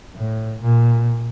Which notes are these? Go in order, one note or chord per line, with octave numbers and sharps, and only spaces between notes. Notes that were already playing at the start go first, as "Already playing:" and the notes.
A2
A#2